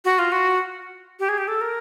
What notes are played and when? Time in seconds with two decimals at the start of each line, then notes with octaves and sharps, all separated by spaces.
0.05 F#4
0.19 F4
0.32 F#4
1.19 G4
1.29 G#4
1.38 G4
1.48 A4
1.61 A#4